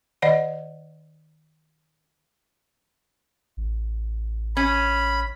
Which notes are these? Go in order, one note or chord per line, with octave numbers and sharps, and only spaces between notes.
D#3 D5 D#5 F#5
A1
C#4 B5